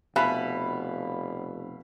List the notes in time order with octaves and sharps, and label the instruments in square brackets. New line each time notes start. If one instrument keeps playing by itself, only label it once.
[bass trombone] F1 [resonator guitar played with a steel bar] B2 [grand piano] E5 F5 F#6 [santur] B5